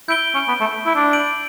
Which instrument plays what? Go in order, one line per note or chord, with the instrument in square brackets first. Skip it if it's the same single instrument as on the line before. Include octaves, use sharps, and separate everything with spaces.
[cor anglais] E4 [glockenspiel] G6 D7 G7
[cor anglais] C#4
B3
A3
E4
D4
[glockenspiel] G6 D7 F#7